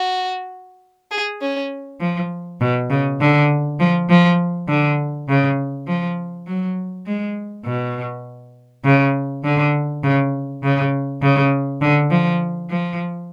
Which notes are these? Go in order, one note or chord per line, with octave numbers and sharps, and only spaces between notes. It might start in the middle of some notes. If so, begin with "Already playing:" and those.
Already playing: F#4
G#4
C#4
F3
B2
C#3
D3
F3
F3
D3
C#3
F3
F#3
G#3
B2
C#3
D3
C#3
C#3
C#3
D3
F3
F3